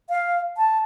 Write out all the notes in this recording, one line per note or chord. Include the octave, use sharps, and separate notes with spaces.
F5
A5